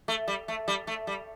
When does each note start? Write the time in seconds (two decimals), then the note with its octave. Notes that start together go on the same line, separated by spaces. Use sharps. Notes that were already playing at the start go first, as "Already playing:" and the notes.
0.08 A3
0.28 G3
0.48 A3
0.68 G3
0.87 A3
1.07 G3